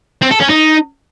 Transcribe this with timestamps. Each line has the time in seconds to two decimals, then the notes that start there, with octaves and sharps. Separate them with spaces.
0.22 C4
0.32 A4
0.41 C#4
0.50 D#4